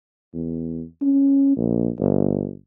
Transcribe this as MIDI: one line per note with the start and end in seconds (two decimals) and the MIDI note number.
0.34 0.84 40
1.02 1.55 61
1.57 1.89 34
2.00 2.54 31